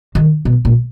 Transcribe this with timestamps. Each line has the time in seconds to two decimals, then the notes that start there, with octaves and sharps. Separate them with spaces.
0.15 D#3
0.45 B2
0.65 A#2